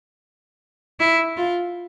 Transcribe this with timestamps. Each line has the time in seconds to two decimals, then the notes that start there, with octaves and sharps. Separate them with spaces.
1.00 E4
1.37 F4